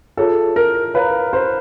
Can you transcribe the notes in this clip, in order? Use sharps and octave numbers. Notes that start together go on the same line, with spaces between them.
F4 G#4 A4 C#5 E5
A#4
B4 C#5 F5 A#5
C5